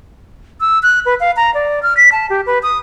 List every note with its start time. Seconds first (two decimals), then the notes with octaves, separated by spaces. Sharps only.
0.61 E6
0.83 F#6
1.06 B4
1.20 F5
1.36 A#5
1.54 D5
1.83 F6
1.97 B6
2.12 A5
2.30 G4
2.46 B4
2.63 D#6